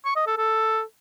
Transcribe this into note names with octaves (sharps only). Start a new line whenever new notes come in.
C#6
D#5
A4
A4